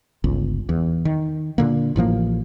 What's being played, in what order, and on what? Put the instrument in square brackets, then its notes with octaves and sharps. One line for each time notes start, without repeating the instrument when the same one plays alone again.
[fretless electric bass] G1 C#2
E2
D#3
A#2 D3 A#3
A1 A2 F3 A#3